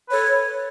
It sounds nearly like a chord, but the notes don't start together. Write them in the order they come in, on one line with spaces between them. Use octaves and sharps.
B4 C#5 A4